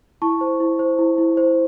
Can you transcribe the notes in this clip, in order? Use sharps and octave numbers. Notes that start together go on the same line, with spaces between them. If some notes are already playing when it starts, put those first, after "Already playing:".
E4 A5 C#6
C5
E4
C5
E4
E4
C5